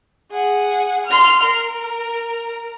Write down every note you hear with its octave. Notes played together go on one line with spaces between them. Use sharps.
G#4 F#5
C6 F6
A#4